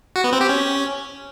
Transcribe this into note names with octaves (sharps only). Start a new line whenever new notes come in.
F#4
B3
C4
G4
C#4